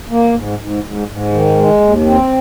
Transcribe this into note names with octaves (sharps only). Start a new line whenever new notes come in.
A#3
G#2
G#2
G#2
G#2
D#3
G#3
D#2
C4